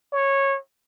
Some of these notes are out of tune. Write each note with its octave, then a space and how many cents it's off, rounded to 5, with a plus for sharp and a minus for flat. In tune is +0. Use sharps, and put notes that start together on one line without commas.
C#5 -15